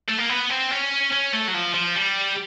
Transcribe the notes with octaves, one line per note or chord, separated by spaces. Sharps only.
A3
A#3
B3
C4
C#4
C#4
A3
F#3
F3
F3
G3